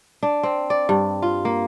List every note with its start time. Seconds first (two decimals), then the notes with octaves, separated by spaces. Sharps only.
0.23 D4
0.43 C4
0.70 D5
0.89 G2
1.22 F4
1.45 A#3